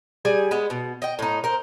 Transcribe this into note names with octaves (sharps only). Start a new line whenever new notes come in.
G3 G#4 G#5
G#3 B3
B2
D#5 G5
A2 D#4
A#4 C5